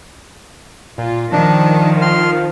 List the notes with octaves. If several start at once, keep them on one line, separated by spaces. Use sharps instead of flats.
A#2 F4
D#3 F3 D4
C6 F6